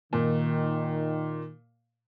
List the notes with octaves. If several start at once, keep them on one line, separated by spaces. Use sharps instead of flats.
A#2 D#3